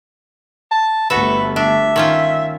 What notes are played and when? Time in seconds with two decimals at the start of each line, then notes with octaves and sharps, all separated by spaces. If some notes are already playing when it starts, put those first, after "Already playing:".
0.71 A5
1.10 G1 A3 F#4 A4 B4 E5
1.56 D4 E5
1.96 D#3 C#4 F4